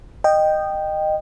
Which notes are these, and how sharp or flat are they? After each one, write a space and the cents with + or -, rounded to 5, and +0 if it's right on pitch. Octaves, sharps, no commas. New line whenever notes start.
D#5 -15 G5 +0